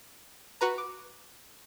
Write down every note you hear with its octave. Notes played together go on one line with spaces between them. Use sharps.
F#4 B4 A#5
D6